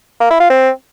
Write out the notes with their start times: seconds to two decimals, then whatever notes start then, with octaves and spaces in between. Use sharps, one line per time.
0.21 A#3
0.30 E4
0.40 F4
0.50 C4